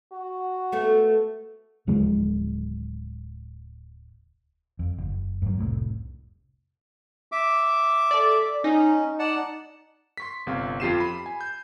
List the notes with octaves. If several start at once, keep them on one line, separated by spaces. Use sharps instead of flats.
F#4
A3 B3
D1 C#3 F3 G#3
F2
F#1
G2 F#3
F1 C2 A2
E5 D6
A4 D5
C#4 D#4
D5 F#5 A5
C6 C#6 B6
G1 C3 C4 F5
F2 F4 G4 C7 D#7 E7
B5
G#5
G6